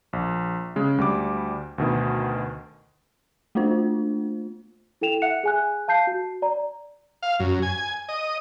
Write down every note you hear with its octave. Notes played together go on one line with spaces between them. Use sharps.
A#1
C#3 G#3
D2 G3 D6
D2 B2 D#3
A3 A#3 D4 F4 C5
E4 A4 G5 E7 F7
E5 F#5 F#6 C#7
G#4 G#5 F#6
F5 A5 G6 C7
F#4
D5 A#5
F5
F#2
G#5
D#5